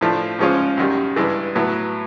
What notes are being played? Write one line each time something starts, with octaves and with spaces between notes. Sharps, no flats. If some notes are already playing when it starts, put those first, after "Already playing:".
A2 F3 A3 D4
G#2 F3 G#3 C#4 F4
F#2 D#3 G3
G2 E3 G#3
A2 F#3 B3